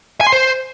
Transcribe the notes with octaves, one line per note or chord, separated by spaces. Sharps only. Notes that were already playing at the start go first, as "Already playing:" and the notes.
G#5
C6
C5